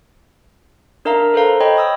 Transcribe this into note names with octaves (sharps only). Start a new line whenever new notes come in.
D4 A#4 E5 F5 A#5
A4 B4 C5 F5 A#5
C#5 D#5 G5 B5
G5 D#6 E6